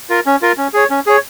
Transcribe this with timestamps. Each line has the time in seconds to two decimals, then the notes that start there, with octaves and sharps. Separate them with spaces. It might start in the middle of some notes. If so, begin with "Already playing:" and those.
0.10 F4 A#4
0.26 C#4
0.42 F4 A#4
0.58 C#4
0.74 G#4 C#5
0.90 C#4
1.07 G#4 C#5